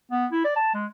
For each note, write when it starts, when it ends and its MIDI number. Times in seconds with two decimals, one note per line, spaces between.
0.11 0.26 59
0.32 0.41 64
0.45 0.55 74
0.56 0.74 81
0.74 0.86 56